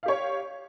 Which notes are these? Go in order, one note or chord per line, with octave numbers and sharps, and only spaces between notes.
G4 C#5 F5